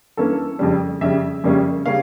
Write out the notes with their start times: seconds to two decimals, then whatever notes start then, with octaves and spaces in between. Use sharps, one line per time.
0.17 G2 E3 A#3 C#4 A4
0.59 F2 C#3 G3
1.01 F2 C#3 G3 E5
1.44 F2 C#3 G3 A#3 C#4
1.85 C#3 G3 A#3 C#4 F5